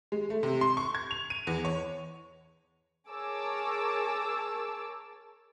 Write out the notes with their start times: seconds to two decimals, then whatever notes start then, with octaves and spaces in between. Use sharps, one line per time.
0.12 G#3
0.30 A3
0.43 C3
0.61 C6
0.77 C#6
0.95 G#6
1.11 F7
1.30 D#7
1.47 E2
1.65 C#5
3.09 G#4 A#4 C#5 A5 D6 E6